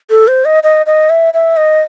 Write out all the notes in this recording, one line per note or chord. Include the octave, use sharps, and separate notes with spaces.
A4
C5
D#5
D#5
D#5
E5
E5
D#5